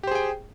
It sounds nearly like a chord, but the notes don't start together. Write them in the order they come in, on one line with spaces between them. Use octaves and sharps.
G4 C5 G#4 G5